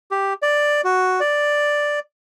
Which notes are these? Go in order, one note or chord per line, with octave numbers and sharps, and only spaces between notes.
G4
D5
F#4
D5